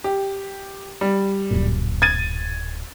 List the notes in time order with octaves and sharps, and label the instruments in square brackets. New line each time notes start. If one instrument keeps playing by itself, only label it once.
[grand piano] G4
G3
[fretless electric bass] D1 F#2 A#2
[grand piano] G#6 A6 D#7